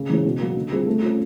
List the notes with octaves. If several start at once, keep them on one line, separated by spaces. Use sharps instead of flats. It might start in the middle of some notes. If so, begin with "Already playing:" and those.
Already playing: C#3
E3 G#3 C#4
B2
F#3 A#3
D3
G3 C4 F4 G#4
A3
C#4 F4